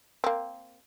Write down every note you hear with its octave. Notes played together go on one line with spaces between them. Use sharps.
A#3 C4